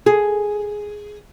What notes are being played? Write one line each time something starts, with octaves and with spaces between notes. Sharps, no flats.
G#4